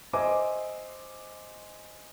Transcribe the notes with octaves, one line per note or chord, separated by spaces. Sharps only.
C5 D#5 E5 G#5 D6